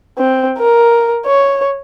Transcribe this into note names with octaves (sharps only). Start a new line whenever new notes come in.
C4
A#4
C#5